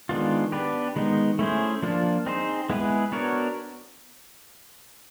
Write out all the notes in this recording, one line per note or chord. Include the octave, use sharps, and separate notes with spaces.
D#3 G#3 B3 D4 F4
B3 D4 G4 B4
D#3 G#3 B3 D#4
A3 C#4 E4 G#4 C5
F3 A#3 D4 F4
C4 D#4 G#4 C5
G#3 B3 E4 G#4 B4
B3 D4 F#4 A#4 C#5